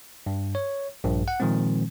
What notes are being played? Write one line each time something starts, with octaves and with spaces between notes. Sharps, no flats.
G2
C#5
A#1 G2
F#5
A#2 D#3 F3 G#3 C4